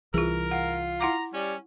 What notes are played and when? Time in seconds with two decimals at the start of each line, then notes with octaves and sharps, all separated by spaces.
0.14 C2 E3 F4 G#4 A#4
0.51 F4 F#5
1.01 E4 F#5 A#5 D6
1.34 G3 C#4